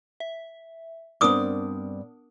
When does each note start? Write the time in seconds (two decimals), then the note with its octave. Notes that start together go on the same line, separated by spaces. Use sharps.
0.20 E5
1.21 G2 B3 C4 D4 A#4 D6 D#6